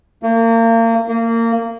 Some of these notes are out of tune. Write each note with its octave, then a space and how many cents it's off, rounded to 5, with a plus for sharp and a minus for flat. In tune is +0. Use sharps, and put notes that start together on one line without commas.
A#3 -35
A#3 -25